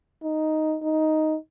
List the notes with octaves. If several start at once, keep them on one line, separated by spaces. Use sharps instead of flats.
D#4
D#4